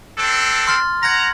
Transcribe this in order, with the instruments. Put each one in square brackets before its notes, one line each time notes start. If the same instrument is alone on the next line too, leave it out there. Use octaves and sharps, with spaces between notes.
[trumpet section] C4 D4 A4
[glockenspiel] C6 F6 A6
[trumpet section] F#5 A#5 [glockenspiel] G#6 A#6